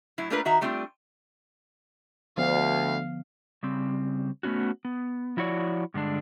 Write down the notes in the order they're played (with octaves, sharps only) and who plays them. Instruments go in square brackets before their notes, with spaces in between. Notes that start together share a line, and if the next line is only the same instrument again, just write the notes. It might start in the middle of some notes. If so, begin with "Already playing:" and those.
[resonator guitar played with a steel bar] A2 F#3 E4
A3 A#3 D4 F4 A#4 B4
D#3 F#4 E5 A#5
G3 A3 C4 D4 F4
[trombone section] D2 [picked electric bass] D3 F3 B3 [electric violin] F5
[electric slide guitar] C#3 G3 C4
A3 B3 C#4 F#4
B3
F3 E4 F#4 C#5 D5
G2 D3 G#3 D4